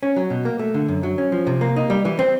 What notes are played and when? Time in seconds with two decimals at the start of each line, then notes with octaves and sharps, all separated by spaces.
0.03 C#4
0.16 F#3
0.30 B2
0.45 A#3
0.59 A3
0.74 D3
0.88 F#2
1.03 F#3
1.18 C#4
1.32 F3
1.47 C3
1.61 A#3
1.76 D#4
1.90 G3
2.05 E3
2.19 C4